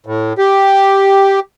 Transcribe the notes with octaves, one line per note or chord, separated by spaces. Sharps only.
A2
G4